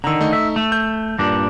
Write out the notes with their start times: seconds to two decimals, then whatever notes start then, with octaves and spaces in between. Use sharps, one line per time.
0.04 D3 D#3 A#5 E6
0.21 A3 D#4
0.33 E5
0.56 A3
0.72 G6
1.19 G2 A#2 D4